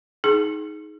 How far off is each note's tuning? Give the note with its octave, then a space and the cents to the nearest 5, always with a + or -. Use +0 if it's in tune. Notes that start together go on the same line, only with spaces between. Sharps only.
D#4 +15 G#4 +20